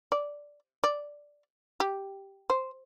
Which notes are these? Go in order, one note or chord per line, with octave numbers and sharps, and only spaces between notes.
D5
D5
G4
C5